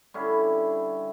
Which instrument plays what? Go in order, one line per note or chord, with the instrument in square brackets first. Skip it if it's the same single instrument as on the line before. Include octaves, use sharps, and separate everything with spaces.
[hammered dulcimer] D3 G3 C#4 E4